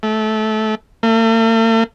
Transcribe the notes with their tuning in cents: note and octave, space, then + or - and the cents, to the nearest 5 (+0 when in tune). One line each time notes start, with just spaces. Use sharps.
A3 -20
A3 +45